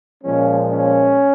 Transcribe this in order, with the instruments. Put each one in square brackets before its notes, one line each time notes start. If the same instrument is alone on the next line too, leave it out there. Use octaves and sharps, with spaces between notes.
[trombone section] A#2 F3 G#3 C#4
C#4